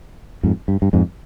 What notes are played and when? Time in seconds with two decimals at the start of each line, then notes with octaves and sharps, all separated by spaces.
0.43 F2 G#2
0.68 G2
0.82 G2
0.93 F2 G#2